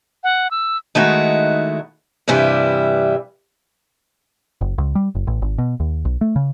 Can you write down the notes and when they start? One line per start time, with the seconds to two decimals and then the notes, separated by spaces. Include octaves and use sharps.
0.24 F#5
0.51 E6
0.95 D#3 G#3 A3 D#4 E4 F#4
2.28 G2 C3 E3 G3 E4
4.61 F#1
4.78 C#2
4.95 G3
5.15 F#1
5.27 A1
5.42 G#1
5.58 B2
5.80 D#2
6.05 B1
6.21 A3
6.36 C#3